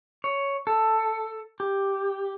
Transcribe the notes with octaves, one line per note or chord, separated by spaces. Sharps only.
C#5
A4
G4